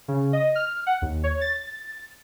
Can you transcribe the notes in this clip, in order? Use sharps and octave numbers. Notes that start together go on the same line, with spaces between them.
C#3
D#5
F6
F#5
D#2
C#5
A6